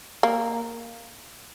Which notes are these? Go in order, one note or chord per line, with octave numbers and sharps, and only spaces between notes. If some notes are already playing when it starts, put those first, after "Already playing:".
A#3